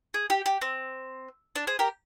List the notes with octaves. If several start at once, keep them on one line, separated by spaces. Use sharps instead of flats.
G#4
G4
G4
C4
D4
G#4 C5
G4 A#4